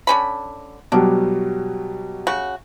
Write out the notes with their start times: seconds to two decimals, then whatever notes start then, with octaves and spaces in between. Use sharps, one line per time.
0.07 D3 C#4 B5
0.92 B2 F#3 G3 D4
2.27 C#3 F#4